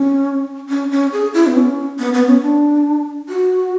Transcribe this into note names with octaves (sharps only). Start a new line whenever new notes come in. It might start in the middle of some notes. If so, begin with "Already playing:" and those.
Already playing: C#4
C#4
C#4
G#4
E4
B3
C#4
B3
B3
C#4
D4
F#4